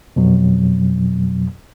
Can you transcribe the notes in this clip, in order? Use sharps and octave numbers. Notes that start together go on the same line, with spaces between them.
F2 B2 F#3